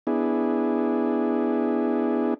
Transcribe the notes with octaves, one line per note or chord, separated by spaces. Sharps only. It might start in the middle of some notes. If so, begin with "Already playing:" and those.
B3 D4 E4 G#4